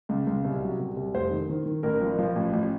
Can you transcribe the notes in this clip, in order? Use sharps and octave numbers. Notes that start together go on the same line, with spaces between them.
C#2
C#2
C2
F#3
C2
C2
F1 C5
D#3
D#3
D#3
A1 A#4
F3
F3
A1
A1